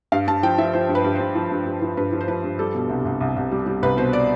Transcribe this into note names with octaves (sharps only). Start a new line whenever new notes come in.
G2 F5
G2 A5
F3 G5
F3 E5
F3 C5
G2
B4
G2
G2 C5
F3
G2
G2
F3
G2 B4
F3
C5
F3 B4
G2
G3 A4
B2
C2
C2
C2
C2
G3
G3
C2 B4
B2 C5
D5